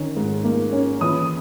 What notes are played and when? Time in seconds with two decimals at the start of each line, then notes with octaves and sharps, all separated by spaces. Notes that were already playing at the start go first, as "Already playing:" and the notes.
Already playing: D#3 C#4
0.17 G#2
0.44 A#3
0.72 C#4
1.01 E3 D#6